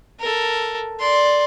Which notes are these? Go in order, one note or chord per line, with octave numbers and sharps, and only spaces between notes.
A4 A#4
D5 C6